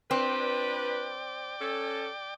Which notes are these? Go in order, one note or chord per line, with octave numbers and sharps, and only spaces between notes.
C4 D4 F4 B4 D5 G5 D6
C#4 A4